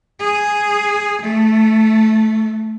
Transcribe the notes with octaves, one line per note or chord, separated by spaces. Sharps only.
G#4
A3